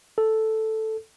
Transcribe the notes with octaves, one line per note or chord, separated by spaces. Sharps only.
A4